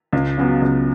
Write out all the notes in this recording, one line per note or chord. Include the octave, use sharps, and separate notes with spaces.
C#2
C#3 F#3 B3
C#2